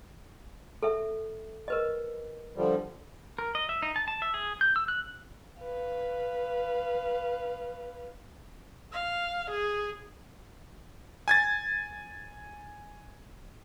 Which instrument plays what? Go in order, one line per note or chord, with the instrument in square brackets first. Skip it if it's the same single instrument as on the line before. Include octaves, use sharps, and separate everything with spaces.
[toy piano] A4 E5
A#4 B4 D#5
[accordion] D3 F3 G3
[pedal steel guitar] A#4
D#5
E5
D#4
A5
A5
E5
G#4
G6
E6
F#6
[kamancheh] B4 F5
[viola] F5
G#4
[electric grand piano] G#5 G#6 A6